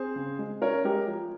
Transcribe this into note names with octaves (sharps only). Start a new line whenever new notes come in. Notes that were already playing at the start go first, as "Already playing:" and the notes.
Already playing: C4 G#4 C5
C#3
G#3
C#4 A#4 C#5
G#3 G4 A#4
F3